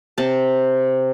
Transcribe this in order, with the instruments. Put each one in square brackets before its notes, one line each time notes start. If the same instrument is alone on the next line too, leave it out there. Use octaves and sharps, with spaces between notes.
[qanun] C3 A5